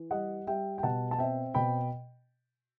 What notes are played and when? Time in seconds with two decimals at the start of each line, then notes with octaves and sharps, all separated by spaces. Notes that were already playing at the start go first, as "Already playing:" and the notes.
Already playing: E3
0.11 G3 D#5 F#5
0.47 G3 E5 G5
0.78 G5
0.83 B2 F#5 A5
1.11 A5
1.19 C4 E5 G5
1.54 B2 G5 B5